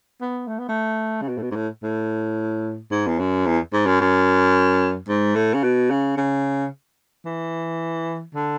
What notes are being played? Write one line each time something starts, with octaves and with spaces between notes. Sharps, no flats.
B3
A3
B3
A3
C#3
B2
A2
B2
G#2
A2
A2
G#2
E2
F#2
E2
G#2
F#2
F#2
G#2
A2
C#3
B2
C#3
C#3
E3
D3